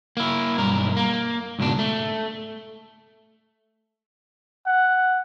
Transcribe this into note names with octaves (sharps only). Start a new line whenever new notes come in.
A#3 E4
B1 G2 A#4
A#3
C#2 G#2 B2 D4
A3
F#5